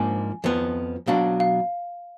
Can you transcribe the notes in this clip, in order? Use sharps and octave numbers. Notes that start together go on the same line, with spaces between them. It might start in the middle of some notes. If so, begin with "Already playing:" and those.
Already playing: G#2 F3 A#3 D4 G#5
F2 F3 B3
B2 F#3 D4 F5
F5